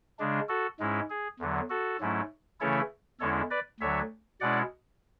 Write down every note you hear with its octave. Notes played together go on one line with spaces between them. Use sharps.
C#3 G#3 D4
F#4 A4
G#2 G#3 C#4 E4
G#4
E2 D3 F#3
F#4 A4
G#2 F#3 A3 C#4 E4
C#3 E3 A3 C#4 E4 A4 C#5
E2 D3 G#3 C#4 E4 A4 C#5
B4 D5
D2 D3 F#3 C#5 E5
B2 G#3 C#4 E4 D5 F#5